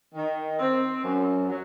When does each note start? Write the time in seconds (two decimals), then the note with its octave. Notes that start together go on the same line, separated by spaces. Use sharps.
0.15 D#3
0.59 C4
1.04 F#2
1.49 F#3